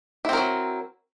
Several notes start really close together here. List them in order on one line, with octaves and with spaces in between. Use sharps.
E4 C4 A#4 F#3